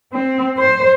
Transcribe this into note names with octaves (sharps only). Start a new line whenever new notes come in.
C4
C5